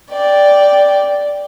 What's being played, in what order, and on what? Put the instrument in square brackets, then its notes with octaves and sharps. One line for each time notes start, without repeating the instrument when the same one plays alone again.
[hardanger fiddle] D5 G5